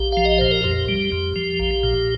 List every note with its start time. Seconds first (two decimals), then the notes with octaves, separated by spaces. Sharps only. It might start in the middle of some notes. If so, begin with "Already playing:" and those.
Already playing: A#1 G4
0.12 F3 F5
0.25 D#5
0.38 A#2 C5
0.51 A#4
0.64 F2 G4
0.88 G3
1.12 F2
1.36 F3
1.60 A#1
1.83 A#2